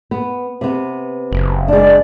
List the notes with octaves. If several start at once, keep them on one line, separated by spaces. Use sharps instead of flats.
B3
C3 B3
F#1
G#3 D4 D5